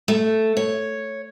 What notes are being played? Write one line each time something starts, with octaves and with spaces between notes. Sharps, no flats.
A3
C#5